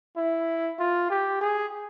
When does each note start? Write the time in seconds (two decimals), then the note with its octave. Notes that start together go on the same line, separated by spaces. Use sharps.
0.17 E4
0.79 F4
1.10 G4
1.41 G#4